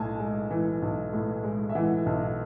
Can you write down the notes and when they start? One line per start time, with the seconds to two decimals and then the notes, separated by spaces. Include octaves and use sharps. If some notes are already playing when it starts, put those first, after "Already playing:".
Already playing: B1 A2 G#5 A5
0.19 G#3
0.50 E3
0.82 B1
1.13 A2
1.44 G#3
1.69 E5
1.75 E3 F#5
2.06 B1